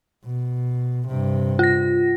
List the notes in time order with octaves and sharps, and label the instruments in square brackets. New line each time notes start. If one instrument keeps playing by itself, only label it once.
[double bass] B2
G2 C3
[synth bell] F4 A#6